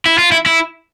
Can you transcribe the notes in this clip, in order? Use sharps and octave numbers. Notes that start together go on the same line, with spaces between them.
E4
F4
E4
E4